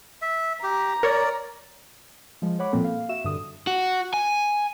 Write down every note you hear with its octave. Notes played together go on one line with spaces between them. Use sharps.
E5
G4 A#5
A#4 C#5 D5
F3 G#3
C#5 F#5 B5 D6
A#2 F3 A#3 C4 A4
F5
F#4 E5 E7
G2 D3 D#6
F#4
G#5